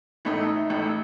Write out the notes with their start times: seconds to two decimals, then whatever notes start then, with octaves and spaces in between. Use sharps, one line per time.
0.25 A1 A2 A3 D#4
0.69 A1 A2 A3